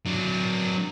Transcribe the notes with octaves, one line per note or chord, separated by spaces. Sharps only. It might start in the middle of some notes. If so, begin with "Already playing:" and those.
F#3 D4